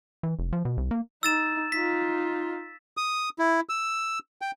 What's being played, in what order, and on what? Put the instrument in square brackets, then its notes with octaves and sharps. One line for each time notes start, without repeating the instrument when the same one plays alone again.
[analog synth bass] E3
F1
F3
B2
C2
A#3
[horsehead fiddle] D#4 [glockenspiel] E6 A6 E7
[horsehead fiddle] D#4 F4 [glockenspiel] B6
[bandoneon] D#6
E4
E6
G5